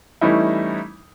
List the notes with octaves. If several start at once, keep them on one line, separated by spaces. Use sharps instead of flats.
E3 G3 A3 C#4 D#4 E4